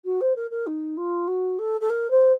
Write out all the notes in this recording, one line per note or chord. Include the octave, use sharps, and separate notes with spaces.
F#4
C5
A#4
A#4
D#4
F4
F#4
A4
A4
A#4
C5